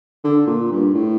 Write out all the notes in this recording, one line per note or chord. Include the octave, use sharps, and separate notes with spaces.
D3
A#2
G2
A2